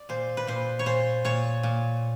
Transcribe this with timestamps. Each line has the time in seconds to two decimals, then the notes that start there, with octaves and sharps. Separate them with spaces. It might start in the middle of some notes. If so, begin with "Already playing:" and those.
Already playing: D5
0.09 A#2 C5
0.37 B4
0.47 A#2 C5
0.79 C#5
0.86 A#2 C5
1.25 A#2 C#5
1.63 A#2